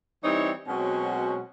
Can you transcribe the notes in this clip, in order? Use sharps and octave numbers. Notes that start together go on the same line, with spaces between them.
E3 G3 C4 D#4 E4 C#5
B2 F#3 G#3 C4 C#4 F#4